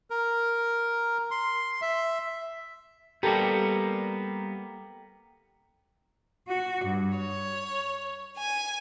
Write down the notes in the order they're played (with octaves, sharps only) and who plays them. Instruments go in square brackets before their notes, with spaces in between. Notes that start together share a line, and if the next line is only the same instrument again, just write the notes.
[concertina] A#4
C6
E5
[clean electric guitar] G3 A#3 B3 [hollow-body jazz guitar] G4 A4 [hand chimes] G5 A#5 C#7
[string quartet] F#4
G2
C#5
G#5